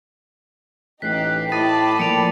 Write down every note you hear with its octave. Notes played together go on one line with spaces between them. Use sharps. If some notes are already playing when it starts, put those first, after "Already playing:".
A1 D#4 G4 F#6 B6 C7
A2 G5 A5 B5 D6 D#6 A6 D#7
A#2 F3 C#7 D7 F7